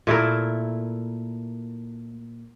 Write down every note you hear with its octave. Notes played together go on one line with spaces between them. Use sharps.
A#2 A3 E4 A#4